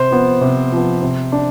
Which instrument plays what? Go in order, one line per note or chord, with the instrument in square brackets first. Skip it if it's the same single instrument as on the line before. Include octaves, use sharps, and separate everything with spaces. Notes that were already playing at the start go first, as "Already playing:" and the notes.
Already playing: [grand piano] C3 [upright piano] C5
[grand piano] F3 B3
C3
F3 B3
C3
D4